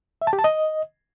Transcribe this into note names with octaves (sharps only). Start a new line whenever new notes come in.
E5
A5
G4
A5
D#5